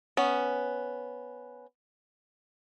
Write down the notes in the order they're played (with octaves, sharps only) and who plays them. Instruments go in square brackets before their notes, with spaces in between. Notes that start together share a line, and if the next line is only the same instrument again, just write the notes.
[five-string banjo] B3 C#4